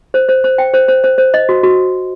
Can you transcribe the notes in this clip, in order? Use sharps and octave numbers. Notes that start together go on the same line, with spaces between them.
C5
C5
C5
G5
C5
C5
C5
C5
D#5
F#4
F#4